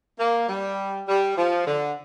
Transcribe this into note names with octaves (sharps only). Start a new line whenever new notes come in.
A#3
G3
G3
F3
D3